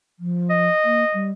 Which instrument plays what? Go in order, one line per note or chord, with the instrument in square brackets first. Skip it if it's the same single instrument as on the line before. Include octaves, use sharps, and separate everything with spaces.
[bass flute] F3
[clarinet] D#5
[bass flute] A#3
G3